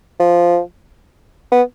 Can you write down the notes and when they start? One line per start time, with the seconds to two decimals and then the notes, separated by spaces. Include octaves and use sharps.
0.20 F3
1.52 B3